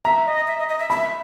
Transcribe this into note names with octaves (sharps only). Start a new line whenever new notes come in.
E5 A#5
D#5
E5
D#5
D#5
E5
E5 B5